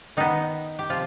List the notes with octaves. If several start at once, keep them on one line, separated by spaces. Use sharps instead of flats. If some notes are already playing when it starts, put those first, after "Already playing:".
D#3 B3 D#4
G4
C3 F3 F4